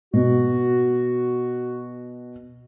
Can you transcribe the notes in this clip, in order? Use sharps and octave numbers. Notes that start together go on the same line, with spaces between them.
B2 F#4